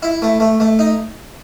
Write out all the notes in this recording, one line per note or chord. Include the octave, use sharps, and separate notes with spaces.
E4
A3
A3
A3
D#4